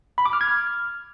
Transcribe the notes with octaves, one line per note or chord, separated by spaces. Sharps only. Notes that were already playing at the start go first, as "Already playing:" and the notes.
B5
D6
F6
G#6
F6